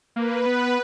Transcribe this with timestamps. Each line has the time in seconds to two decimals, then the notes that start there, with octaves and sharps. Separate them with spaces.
0.16 A#3 B4
0.46 B3